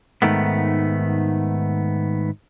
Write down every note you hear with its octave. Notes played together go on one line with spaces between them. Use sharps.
G#2 D#3 A3 B3